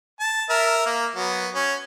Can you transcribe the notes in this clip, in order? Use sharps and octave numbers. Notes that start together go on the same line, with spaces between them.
A5
A#4 E5
A#3
F#3 B3
C#4